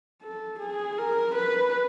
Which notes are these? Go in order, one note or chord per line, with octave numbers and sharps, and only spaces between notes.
A4
G#4
A#4
B4